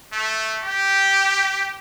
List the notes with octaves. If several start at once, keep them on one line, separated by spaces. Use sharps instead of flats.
A3
G4